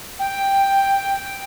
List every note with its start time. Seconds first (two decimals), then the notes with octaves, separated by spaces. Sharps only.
0.19 G5